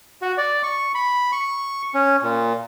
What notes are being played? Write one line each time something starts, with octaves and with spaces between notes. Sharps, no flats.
F#4
D5
C#6
B5
C#6
C#4
A#2